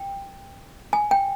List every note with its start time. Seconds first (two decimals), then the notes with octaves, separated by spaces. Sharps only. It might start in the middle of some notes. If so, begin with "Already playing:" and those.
Already playing: G5
0.93 G#5
1.11 G5